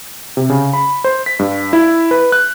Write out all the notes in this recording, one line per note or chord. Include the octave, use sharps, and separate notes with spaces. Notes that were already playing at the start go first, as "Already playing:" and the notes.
C3
C#3
B5
C5
B6
G2
E4
B4
F#6